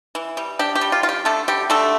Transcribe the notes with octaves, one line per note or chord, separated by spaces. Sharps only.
E3
G3
D4 G4
G4
G3
F4
F4
G4
D3 A3 A4
G3 G4
D3 A3 A4